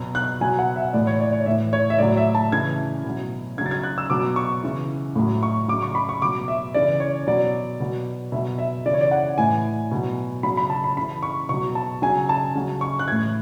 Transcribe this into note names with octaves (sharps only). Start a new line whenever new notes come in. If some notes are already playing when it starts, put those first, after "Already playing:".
Already playing: B2 F#3
F#6
B2 F#3 G#5
F#5
E5
A2 E3 D5
C#5
D5
C#5
A2 E3 E5
C#5
E5
A2 F#3 D5
E5
A5
C#3 E3 G#6
B2 F#3
C#3 F#3 G#6 A6
G#6
F#6
E6
B2 F#3 D6
C#6
C#3 E3
A2 F#3
C#6
C#3 F#3 D6
C#6
B5
C#6
B2 F#3 D6
E5
C#3 E3 D5
C#5
B2 F#3 D5
B2 F#3
B2 F#3 E5
E5
C#3 E3 D5
C#5
D5
F#5
A2 E3 G#5
B2 F#3
C#3 F#3 B5
B5
A5
B5
C#3 E3 B5
C#6
B2 F#3 C#6
A5
C#3 F#3 G#5
A5
C#3 F#3
C#6
F#6
A2 E3 G#6